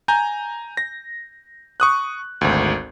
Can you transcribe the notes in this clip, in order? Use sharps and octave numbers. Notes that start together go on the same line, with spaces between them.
G#5 A#5 G6
A#6
C#6 D#6 F#6
G#1 D2